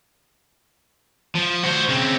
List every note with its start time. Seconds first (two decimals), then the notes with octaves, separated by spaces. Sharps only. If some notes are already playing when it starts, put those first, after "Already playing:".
1.35 F3
1.63 F#4 C5
1.89 C#3 C4